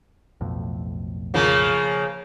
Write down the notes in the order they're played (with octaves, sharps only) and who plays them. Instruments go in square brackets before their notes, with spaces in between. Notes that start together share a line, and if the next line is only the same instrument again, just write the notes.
[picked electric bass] B1 F2 A2
[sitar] C#3 F3 A#3